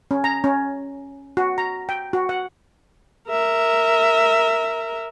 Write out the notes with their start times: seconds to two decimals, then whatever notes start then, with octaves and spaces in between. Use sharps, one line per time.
0.11 C#4
0.24 A#5
0.44 C#4
1.37 F#4
1.58 A#5
1.89 G5
2.13 F#4
2.29 F#5
3.29 A#4 E5